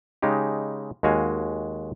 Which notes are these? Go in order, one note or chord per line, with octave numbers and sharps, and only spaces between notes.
C#3 G#3 D#4 G4
D#2 G#3 F#4 F5 G#5